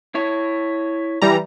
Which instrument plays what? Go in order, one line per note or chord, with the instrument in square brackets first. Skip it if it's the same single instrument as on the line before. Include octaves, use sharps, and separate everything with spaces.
[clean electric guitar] E4 C#5
[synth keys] E3 G3 A#5